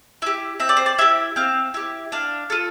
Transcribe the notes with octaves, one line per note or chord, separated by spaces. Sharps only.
E4 G4 E5
C4 E5
D5
C5
D5
E4 G4 E5
C4 F5
E4 G4
D4 F5
F4 A4